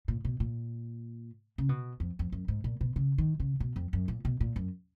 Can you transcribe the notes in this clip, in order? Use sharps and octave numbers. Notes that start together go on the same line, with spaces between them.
A#2
B2
A#2
C#3
B2
F2
F2
F#2
G#2
A#2
B2
C#3
D#3
C#3
B2
F2
F#2
A#2
B2
A#2
F#2